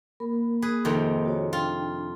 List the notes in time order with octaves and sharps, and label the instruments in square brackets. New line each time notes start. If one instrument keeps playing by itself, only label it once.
[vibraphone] A#3 A#4 B5
[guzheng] G#4 B4
F2 C3 D#3
[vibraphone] F#4 C#5
[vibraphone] D4 G5 [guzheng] F4